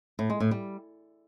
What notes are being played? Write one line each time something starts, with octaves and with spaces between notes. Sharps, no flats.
A2
G#3
A2
G3